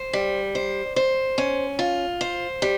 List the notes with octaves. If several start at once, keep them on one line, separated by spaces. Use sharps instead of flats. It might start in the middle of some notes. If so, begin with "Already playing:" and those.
Already playing: C5
G3
C5
C5
C#4
F4
C5
G3